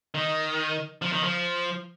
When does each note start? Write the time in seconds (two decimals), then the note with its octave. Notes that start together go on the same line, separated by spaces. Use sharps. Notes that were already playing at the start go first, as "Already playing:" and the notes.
0.14 D#3
1.02 F3
1.12 D#3
1.24 F3